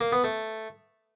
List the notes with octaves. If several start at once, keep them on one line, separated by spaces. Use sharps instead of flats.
A#3
B3
A3